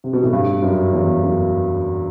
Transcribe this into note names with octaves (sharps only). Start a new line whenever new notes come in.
C3
B2
A2
G2
F#2
E2
F#2